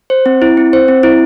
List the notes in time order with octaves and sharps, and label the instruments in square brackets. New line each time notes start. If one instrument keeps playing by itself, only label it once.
[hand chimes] C5
C4
E4
C4
C5
C4
E4